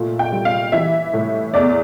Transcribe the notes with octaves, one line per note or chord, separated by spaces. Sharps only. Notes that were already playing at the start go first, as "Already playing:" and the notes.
Already playing: A#2 A3
G5
G3
F5
E3 E5
A2
E2 D5